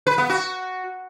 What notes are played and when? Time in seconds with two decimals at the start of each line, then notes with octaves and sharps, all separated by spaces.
0.07 B4
0.18 B3
0.29 F#4